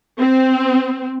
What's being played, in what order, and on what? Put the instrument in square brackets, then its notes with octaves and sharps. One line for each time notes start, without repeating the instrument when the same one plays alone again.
[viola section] C4